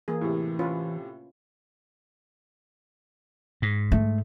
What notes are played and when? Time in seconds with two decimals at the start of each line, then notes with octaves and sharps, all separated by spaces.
0.08 E3 A#3 G#4
0.21 A2 C3
0.59 C#4 F4 B4
3.62 G#2
3.92 A3